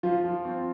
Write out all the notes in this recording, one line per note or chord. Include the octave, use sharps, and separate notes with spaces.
F3 F4
F3
C4